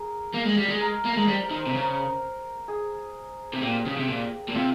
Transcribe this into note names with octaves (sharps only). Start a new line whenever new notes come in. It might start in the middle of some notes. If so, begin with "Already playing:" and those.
Already playing: G#4 A#4
A#3
G#3
G3
G#3
A#4
A#3
A#4
G#3
G3 C5
A#4
D#3
C5
C3
C#3 A#4
G#4
C3
A#2 G4
C#3
C3
A#2
A#2
C3 F4